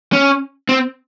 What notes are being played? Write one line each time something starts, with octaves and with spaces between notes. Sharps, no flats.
C#4
C4